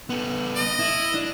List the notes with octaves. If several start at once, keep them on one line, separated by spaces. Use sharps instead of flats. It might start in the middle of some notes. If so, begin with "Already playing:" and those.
B3 A4
D#5
E4
D4